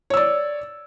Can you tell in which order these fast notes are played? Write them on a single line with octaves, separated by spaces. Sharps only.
C#5 E6 D5